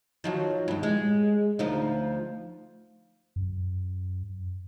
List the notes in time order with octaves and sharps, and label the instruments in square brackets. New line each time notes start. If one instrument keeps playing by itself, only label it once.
[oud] D#3 F3 F#3
E2 G2
G#3
D2 F3 D#4
[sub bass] F#2